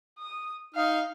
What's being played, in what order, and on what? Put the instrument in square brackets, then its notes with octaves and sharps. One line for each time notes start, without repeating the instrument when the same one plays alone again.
[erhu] D#6
[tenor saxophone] D#4 [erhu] F5